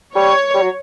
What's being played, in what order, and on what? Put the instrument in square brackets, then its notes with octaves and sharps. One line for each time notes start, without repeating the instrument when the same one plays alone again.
[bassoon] G3 [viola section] C#5
[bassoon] G3
F#3